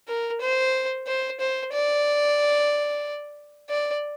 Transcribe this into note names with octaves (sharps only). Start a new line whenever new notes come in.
A#4
C5
C5
C5
D5
D5